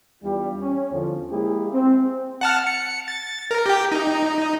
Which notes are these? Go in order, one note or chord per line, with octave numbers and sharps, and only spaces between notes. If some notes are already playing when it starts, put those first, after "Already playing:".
E2 G3 D4 E4 F4 G4
C#4
E2 D3 F3
G#3 A#3 E4 G4 G#4
C4
F#5 A5 F6
C#7
A6
A#4
G4 G5
D#4